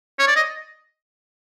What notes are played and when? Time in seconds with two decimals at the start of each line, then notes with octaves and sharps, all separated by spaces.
0.19 C#5
0.27 D5
0.36 D#5